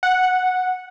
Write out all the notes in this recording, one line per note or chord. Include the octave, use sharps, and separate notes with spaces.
F#5